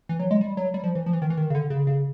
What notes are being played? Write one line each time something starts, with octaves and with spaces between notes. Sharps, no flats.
E3
F#3
G#3
G3
F#3
G3
F3
E3
F3
E3
D#3
E3
D#3
C#3
D3
C#3
C#3